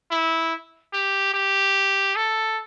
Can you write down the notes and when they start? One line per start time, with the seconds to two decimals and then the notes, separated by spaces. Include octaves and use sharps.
0.11 E4
0.93 G4
1.34 G4
2.16 A4